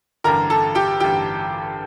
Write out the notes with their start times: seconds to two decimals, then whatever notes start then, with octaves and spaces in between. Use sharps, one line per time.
0.24 A1 G2 D3 A#4 A#5
0.50 A4 A5
0.75 G4 G5
1.00 A1 G2 D3 G4 G5